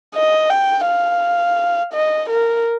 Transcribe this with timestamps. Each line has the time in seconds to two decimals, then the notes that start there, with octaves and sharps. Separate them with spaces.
0.15 D#5
0.50 G5
0.86 F5
1.94 D#5
2.30 A#4